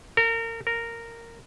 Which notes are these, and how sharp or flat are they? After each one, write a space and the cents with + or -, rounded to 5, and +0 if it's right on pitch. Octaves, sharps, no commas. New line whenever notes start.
A#4 -30
A#4 -10